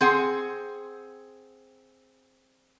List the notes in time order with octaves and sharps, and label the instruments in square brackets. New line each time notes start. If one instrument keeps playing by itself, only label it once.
[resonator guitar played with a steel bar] C4 G#4 F#5